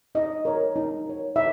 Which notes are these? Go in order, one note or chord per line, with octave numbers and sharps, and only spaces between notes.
D#4 D#5
A#4 C#5
D#4
A#4 C#5
D#4 E5